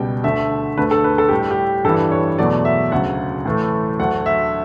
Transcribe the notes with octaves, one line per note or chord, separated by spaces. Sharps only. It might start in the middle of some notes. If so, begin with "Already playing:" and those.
Already playing: C#2 B2 G3 G5
D2 D3 A3 E5
D2 D3 A3 B4
A4
B4
A4
A2 G3 G4
G4
G2 E3 G3 A4
C#5
E2 B2 F#3 A3 D5
E5
D2 C#3 F#3 F#5
A2 E3 A3
D2 D3 F#3 A3 F#5
E5